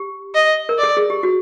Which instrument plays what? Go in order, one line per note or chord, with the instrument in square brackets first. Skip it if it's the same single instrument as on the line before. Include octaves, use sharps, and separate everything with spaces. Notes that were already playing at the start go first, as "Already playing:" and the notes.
Already playing: [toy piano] G4
[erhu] D#5
[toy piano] A#4
[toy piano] A4 [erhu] D5
[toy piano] G#4
G4
F#4